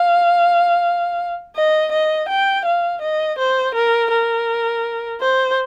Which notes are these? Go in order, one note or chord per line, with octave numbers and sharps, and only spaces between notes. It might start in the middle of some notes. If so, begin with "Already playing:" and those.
Already playing: F5
D#5
D#5
G5
F5
D#5
C5
A#4
A#4
C5